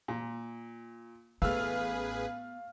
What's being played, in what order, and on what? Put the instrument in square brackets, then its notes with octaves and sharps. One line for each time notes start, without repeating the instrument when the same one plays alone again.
[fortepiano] A#2
[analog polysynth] A1 G#4 B4 [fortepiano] A3 E6 [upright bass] B3 [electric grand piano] F5 F6